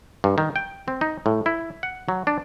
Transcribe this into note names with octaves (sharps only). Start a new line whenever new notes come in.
G2
D#3
G5
C4
D#4
A2
E4
F#5
F#3
D4